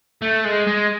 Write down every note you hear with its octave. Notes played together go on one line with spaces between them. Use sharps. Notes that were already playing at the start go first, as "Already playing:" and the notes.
A3
G#3
G#3